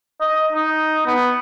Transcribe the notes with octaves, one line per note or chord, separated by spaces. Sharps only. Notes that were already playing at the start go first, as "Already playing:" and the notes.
D#5
D#4
B3